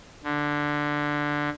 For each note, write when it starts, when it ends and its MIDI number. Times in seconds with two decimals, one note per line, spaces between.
0.24 1.50 50